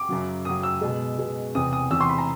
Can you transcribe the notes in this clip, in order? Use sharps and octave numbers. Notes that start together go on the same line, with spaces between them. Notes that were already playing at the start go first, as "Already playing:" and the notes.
Already playing: D6
F#2 C#3 F#3
F#2 C#3 F#3 D#6
E6
B2 G#3
B2 G#3
E2 C3 E3 D#6
D#6
E2 C3 E3 E6
C6
B5
A#5